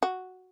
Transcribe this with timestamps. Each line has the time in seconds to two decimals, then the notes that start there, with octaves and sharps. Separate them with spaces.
0.03 F#4